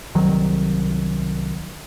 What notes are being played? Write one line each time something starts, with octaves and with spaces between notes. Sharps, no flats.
C2 D#3 F#3